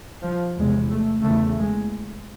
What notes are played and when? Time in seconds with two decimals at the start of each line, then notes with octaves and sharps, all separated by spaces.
0.22 F3
0.57 E2 C3 G#3
0.90 A3
1.24 E2 C#3 A3
1.58 G#3